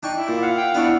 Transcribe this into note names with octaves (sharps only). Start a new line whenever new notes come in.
D4 D#4 G5 C#6
E4
A#2
F5 F#5
G5
B3 D4 E4 C#5